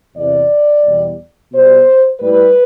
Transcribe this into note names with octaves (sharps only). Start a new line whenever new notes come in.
E2 C3 E3 D5
E2 B2 G3
B2 G3 C5
A2 G3 B4